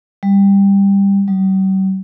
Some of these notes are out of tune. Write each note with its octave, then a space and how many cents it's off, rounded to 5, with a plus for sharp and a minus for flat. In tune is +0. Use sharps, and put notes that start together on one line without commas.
G3 +15
G3 -45